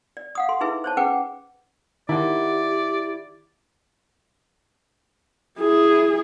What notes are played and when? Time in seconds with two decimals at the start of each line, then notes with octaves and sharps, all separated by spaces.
0.17 D5
0.35 F5 F#5 D#6
0.49 A4 C6
0.61 D#4 E4 G#4 B4 E5
0.84 C5 C#5 A5
0.97 C#4 G#4 B4 F#5 G5 D6
2.09 D#3 E4 G4 D5 F#5
5.59 E4 G#4